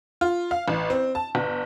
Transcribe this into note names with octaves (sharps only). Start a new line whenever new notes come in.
F4
F5
A1
C4
A5
G1